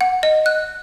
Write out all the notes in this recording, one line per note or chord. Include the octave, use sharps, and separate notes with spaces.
F#5
D#5
F#6